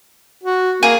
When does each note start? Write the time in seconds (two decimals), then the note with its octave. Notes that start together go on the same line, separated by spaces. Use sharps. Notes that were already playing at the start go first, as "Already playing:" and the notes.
0.43 F#4
0.83 A#3 G#4